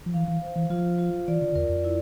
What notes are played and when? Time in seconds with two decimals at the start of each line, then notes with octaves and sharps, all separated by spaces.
0.06 F3
0.14 E3 F5
0.28 E3
0.42 C5
0.56 E3
0.70 F3 F4
0.99 F4
1.28 E3 D5
1.42 D3
1.55 E2 A#4
1.69 F2
1.84 E4